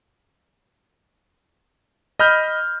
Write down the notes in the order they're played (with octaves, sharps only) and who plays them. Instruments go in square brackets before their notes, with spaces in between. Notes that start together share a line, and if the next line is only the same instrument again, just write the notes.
[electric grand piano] D#5 B5 F6 G6